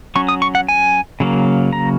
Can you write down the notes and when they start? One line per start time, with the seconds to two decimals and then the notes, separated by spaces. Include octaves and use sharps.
0.15 F#3 C#4 C#6
0.29 D#6
0.42 C#6
0.55 F#5
0.68 G#5
1.20 C#3 F#3 A#3
1.73 A#5